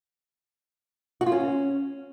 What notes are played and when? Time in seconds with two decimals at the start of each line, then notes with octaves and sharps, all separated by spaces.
1.21 F#4
1.26 F4
1.32 C#4